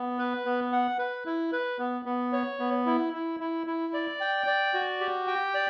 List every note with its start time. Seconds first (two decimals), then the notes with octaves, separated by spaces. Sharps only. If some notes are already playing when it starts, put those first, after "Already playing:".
Already playing: B3
0.19 B4
0.46 B3
0.72 F#5
0.98 B4
1.26 E4
1.53 B4
1.79 B3
2.05 B3
2.32 C#5
2.59 B3
2.86 E4
3.13 E4
3.40 E4
3.67 E4
3.94 D5
4.20 G5
4.47 D5
4.74 F#4
5.00 G4
5.27 G5
5.54 D5